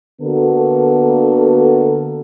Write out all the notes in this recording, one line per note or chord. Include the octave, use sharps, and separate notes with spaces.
D3 A#3 B3 F#4 A4 A#4